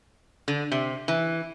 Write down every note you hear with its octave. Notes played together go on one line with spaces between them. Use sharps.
D3
C3
E3